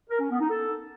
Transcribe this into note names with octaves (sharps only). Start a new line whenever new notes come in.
A#4
C#4
B3
D#4
A4